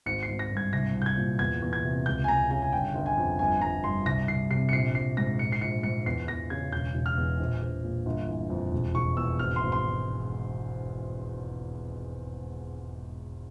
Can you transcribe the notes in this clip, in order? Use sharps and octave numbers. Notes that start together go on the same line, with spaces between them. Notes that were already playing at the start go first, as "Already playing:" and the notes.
G#1 C#7
C7
G#1
A#6
G2
G#6
C2 A#6
C2
G6
G#6
A#2
E2 G#6
E2
G#6
C3
C#2 G6
G#5
C#2 A#5
C#3 G#5
G#5
G1 G5
G1
G#5
F2
G1 G#5
G1 A#5
G2 C6
C2 A#6
C2 C7
C3 C7
C#7
A#1 C7
A#1 C7
G#2 A#6
A#1 C#7
C7
A#1 C#7
G#2 C#7
E2 C7
E2 A#6
C#3 G#6
E1 G6
E1
F6
E2
A#1
A#1
A#2
G1
E3
F2
E1
E1 C#6
E2 E6
G#1 F6
C6
G#1
C6